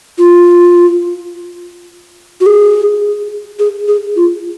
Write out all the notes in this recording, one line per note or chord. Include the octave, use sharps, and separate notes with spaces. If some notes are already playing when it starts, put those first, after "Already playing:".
F4
F#4
G#4
G#4
G#4
F4